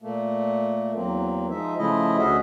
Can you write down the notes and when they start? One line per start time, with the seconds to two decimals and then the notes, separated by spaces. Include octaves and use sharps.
0.02 A#2 A3 A#3
0.95 E2 F#3 A#3 C4
1.51 F3 G#3 D#4 E5
1.78 C#3 F3 A3 E4 D#5
2.18 D2 C#4 F#4 G#4 D#5 E5